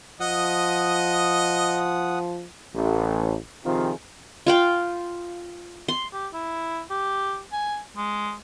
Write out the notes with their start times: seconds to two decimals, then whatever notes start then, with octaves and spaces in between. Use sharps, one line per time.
0.20 F3 D#5 F#5 D#6
2.75 A1
3.65 C3 D#3 F3 C4 F4 G#4
4.46 F4 F5 G5
5.88 C6
6.13 G4
6.34 E4
6.90 G4
7.52 G#5
7.97 G#3